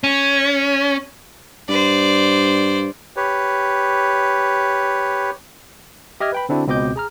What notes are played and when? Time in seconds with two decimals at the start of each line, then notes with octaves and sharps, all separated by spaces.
0.04 C#4
1.69 G2 C5 D5
3.16 G4 B4 C#5
6.20 G4 D#5 E5 F6 G#6
6.32 B4 G5 B5
6.49 D3 C4 D4 E4 F#4
6.67 C#2 B2 C4 D#5 D6 G6
6.96 G#4 A#5 F6